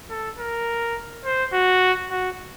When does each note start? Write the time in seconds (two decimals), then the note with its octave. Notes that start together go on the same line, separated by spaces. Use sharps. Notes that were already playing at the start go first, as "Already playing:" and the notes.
0.10 A4
0.38 A#4
1.25 C5
1.53 F#4
2.10 F#4